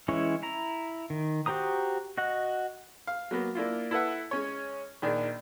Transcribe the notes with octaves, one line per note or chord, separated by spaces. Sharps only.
E3 G#3 C#4 E4 C#5
E4 A#5
D#3
F#4 G4 C5 A#5 D#6
F#4 D#5 F#5
F5
F#3 A#3 B3
A#3 D4 E4 F4
E4 A4 B4 E5 F#5
G#3 C#4 C#5
A#1 D#3 D4 G#4